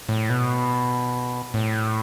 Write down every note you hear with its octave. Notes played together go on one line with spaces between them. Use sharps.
A2
B2
A2